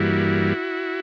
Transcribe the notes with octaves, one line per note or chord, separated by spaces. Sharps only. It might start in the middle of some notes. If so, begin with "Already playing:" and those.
Already playing: G2 E3 G3 A#3 E4 F#4